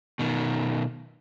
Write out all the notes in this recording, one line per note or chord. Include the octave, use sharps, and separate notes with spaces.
B2 D#3